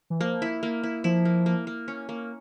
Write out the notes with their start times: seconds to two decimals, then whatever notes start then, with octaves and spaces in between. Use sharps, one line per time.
0.10 E3
0.21 F3 A#3
0.42 E4
0.63 A#3
0.83 E4
1.04 F3 E4
1.25 A#3
1.46 A#3
1.67 A#3
1.88 C#4
2.09 A#3